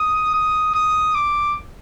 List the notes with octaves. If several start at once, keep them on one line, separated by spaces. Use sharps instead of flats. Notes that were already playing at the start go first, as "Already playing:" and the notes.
Already playing: D#6
D#6
D#6
D6